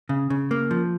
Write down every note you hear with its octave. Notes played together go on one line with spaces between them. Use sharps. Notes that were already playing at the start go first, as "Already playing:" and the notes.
C#3
C#3
A#3
F3